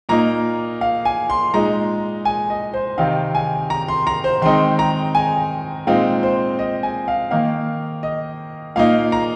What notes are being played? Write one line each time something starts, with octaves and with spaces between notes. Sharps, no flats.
A#2 A#3 D#4 A#5
F5
G#5
C6
A#2 G#3 D#4 A#5
G#5
D#5
C5
C3 D#3 C4 D#4 F5
G#5
A#5
C6
A#5
C5
D#3 G#3 C4 D#4 C6
A#5
G#5
A#2 G#3 C4 D#4 F5
C5
D#5
G#5
F5
D#3 A#3 D#4 F5
D#5
A#2 A#3 D#4 F5
A#5